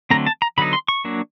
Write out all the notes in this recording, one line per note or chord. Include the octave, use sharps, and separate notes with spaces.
D3 F#3 A3 C4 A#5
A5
A#5
D3 F#3 B3 D#4 B5
C6
C#6
F#3 A#3 D4